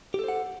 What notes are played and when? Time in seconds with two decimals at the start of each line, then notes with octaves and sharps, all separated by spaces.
0.14 G4
0.19 A4
0.24 C5
0.28 F#5